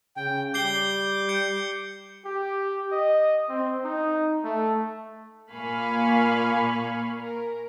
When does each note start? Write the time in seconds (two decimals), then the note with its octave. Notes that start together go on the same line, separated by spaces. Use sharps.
0.17 C#3 G5
0.54 G3 D6 G6 C7 G7
1.29 G6 C#7
2.25 G4
2.92 D#5
3.49 C4
3.84 D#4
4.44 A3
5.52 A#2 A#3 F5 G#5 B5 C#6
7.17 A#4